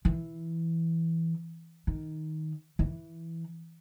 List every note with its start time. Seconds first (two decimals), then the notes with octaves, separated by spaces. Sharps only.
0.05 E3
1.87 D#3
2.79 E3